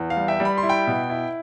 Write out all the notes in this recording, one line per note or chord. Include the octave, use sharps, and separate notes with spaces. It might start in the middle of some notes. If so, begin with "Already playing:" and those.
Already playing: E2
F5
G3
E5 G5
G3
B5
C6
E4
G5 B5
B2
E4